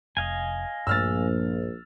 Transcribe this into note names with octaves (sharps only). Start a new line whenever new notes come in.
F1 D#5 F5 G#5
A#1 G2 A3 E6 F6 A6